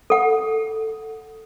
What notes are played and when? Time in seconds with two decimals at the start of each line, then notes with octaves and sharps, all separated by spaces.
0.10 A4 F#5